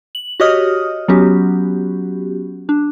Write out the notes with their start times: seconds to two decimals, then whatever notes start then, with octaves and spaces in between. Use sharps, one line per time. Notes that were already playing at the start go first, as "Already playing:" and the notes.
0.15 F#7
0.40 F#4 G4 C#5 D#5 D#6 F6
1.08 F#3 B3 C#4 F#4 G4
2.69 D4